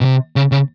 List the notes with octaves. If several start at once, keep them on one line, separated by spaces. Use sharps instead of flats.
B2
C3
C#3
C#3